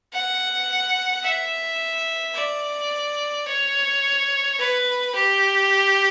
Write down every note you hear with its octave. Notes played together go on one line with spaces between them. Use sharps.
F#5
E5
D5
C#5
B4
G4